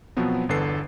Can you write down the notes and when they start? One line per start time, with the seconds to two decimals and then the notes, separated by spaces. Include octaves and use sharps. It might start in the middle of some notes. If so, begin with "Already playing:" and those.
0.16 B2 F3 F#3 B3 C4
0.49 G1 E2 D3 A4 B4 C7